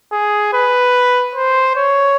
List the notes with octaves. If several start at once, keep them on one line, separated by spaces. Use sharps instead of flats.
G#4
B4
C5
C#5